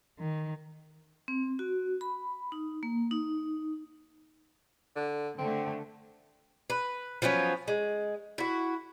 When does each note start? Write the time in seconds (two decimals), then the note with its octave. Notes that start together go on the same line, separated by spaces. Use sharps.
0.18 D#3
1.28 C4
1.59 F#4
2.01 B5
2.52 D#4
2.83 A#3
3.11 D#4
4.96 D3
5.38 D3 A3 C4
6.70 B4
7.22 F3 F#3 B3 C#4
7.68 G#3
8.38 E4 F#4